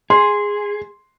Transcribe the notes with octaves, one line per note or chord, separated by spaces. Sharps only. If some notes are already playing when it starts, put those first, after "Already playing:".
G#4 C6